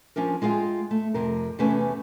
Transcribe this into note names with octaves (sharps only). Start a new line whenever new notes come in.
F3 C#4 D4 A#4
G#3 F4 G#4 F5 G5
A3
F2 C3 A#4
E2 C3 A3 C#4 B4 G#5